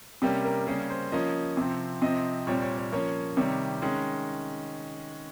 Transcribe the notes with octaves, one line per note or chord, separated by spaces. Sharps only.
C3 G3 A#3 C#4 G4
A#4
C#3 G3 A#3 C#4 G#4
C5
F3 A#3 C#4 D#5
C3 F3 C4
C3 F3 C4 D#5
A#2 G3 C4 C#5
C#5
C#5
F3 A#3 C#4 C#5
C3 D#3 G3 C#5
D#3 G#3 C#4